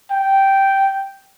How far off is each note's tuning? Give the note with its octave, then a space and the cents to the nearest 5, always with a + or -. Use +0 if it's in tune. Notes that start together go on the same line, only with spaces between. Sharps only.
G5 -10